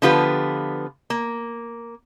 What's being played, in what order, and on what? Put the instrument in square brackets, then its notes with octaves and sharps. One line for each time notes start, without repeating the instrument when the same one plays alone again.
[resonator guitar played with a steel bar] D3 F3 B3 F4 G4 B4
A#3